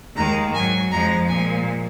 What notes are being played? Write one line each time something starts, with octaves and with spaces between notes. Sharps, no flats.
D#2 D#3 G#3 A#5
G#2 F#3 G#5
F2 F3 G#3 A#5
A#2 F3 G#3 G#5